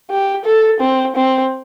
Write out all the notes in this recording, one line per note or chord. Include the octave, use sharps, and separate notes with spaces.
G4
A4
C4
C4